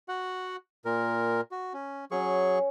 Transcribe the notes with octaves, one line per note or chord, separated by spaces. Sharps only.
F#4 F#5
A#2 A#4
F#4
C#4
F#3 C#4 G#4 C#6 D#6